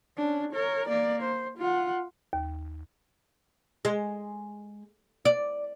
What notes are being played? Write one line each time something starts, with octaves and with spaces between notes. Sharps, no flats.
C#4 D4
A#4 C#5
A#3 D5
C5
F4 F#5
D#2
G#3
D5